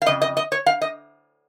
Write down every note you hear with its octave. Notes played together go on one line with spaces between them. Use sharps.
F5
F2 C#3 D#5
D#5
D#5
C#5
F5
D#5